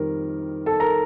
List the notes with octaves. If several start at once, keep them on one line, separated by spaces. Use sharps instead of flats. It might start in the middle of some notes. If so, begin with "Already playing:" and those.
Already playing: F2 D#3 G3 A#4
A4 A5
A#4 A#5